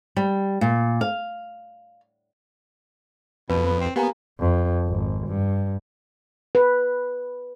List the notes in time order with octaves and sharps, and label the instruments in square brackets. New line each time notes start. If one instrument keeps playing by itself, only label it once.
[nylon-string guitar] G3
A#2
F5
[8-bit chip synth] F2 [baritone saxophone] B2 [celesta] B4
[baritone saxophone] B3
C4
[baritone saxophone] A#3 [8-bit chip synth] B3 [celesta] G4 G#5 A#5
[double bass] F2
G#1
G2
[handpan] B4